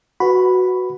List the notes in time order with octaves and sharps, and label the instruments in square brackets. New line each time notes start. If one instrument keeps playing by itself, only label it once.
[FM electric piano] F#4 [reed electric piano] B4 B5